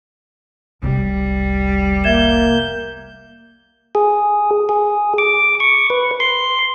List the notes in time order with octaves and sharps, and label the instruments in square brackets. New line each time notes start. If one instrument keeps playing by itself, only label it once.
[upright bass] F1 C2 [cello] G3
[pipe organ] A#3 G6 [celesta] E5 G#6 E7
[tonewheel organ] G#4
G#4
D6
C#6
B4
C6